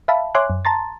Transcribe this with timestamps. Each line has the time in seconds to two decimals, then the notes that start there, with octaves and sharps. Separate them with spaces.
0.08 E5 F5 A5 B5
0.35 C#5 E5 G#5 C6 D6 F#6
0.50 F#2
0.65 A5 A#5 C6 A6